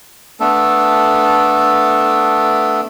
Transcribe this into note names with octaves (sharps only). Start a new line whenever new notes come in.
A3 B3 D4 A4